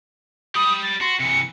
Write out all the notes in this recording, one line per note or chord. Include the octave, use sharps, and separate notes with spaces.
G4 B5 D#6
A6
F#4 C6
C3 E3 C#7